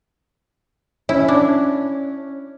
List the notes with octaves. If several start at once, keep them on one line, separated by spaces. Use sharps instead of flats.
C#4 E4
D4